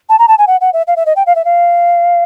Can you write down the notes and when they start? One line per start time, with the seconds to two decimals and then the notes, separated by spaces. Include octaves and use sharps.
0.09 A5
0.19 A#5
0.28 A5
0.38 G#5
0.47 F#5
0.61 F#5
0.73 E5
0.87 F5
0.96 E5
1.06 D#5
1.16 G5
1.27 F5
1.35 E5
1.45 F5